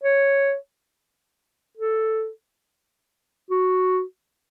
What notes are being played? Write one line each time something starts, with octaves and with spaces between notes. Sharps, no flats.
C#5
A4
F#4